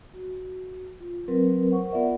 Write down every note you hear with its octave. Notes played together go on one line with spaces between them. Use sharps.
F#4
F4
F#3 C4 A#4 B4
A#4 C5 F#5 C#6
B3 F4 A#4 D5 E5 F#5